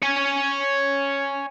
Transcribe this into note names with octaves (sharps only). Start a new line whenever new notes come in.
C#5 G#5